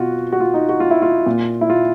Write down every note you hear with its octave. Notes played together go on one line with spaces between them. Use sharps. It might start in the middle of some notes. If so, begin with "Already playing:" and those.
Already playing: B2 F4 F#4
F#4
F4
D#4
F#4
F4
E4
F4
A#2
E4
F4